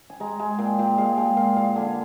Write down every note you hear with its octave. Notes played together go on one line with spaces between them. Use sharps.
G#5
G#3 A#5
G#3 G#5
A#2 G5
A#2 G5
G#3 F5
G#3 G5
A#2 F5
A#2 F5
D3 G#5
G#5